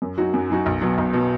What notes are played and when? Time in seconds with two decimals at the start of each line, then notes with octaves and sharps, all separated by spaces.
0.02 F#2
0.18 F#3 D#4 F#4
0.34 F#2
0.50 F#3 D#4 F#4
0.66 B1
0.81 B2 F#3
0.98 B1
1.13 B2 F#3